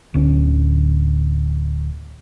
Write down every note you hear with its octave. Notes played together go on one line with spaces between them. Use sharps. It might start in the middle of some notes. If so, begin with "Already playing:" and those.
D1 D2 C#4